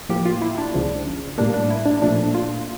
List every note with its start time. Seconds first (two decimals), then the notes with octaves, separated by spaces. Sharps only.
0.09 A2 F3 A#3 G4
0.26 F4
0.42 E4
0.58 D4
0.74 C#2 C#3 F3
1.38 A2 G3 A#3 D4
1.54 D4
1.71 E4
1.86 D4
2.02 A#2 F3 A3 D4
2.35 F4